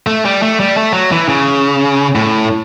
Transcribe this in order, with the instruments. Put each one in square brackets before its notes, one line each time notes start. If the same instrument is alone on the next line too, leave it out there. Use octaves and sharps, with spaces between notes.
[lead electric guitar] A3
G3
A3
G3
A3
F#3
E3
C#3
A2